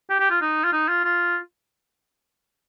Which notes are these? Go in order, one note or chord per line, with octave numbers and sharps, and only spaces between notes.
G4
G4
F4
D#4
F4
D#4
F4
F4